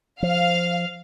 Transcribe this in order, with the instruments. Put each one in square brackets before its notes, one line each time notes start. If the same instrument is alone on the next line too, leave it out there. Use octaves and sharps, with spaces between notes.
[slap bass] F3 [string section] F5